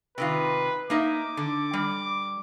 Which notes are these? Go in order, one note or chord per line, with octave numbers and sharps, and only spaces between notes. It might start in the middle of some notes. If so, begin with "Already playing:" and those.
C3 D#3 F4 B4
A#3 D#4 E5 D6
D3
G3